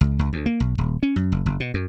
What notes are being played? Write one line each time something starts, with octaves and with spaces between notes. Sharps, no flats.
C#2
C#2
D2
A#3
B1
D#1
C#4
F#2
F#1
F#1
B2
F#2